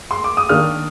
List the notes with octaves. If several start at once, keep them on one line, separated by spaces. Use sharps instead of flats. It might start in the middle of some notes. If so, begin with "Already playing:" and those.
C6
D6
D#6
D#3 A#3 D4 F6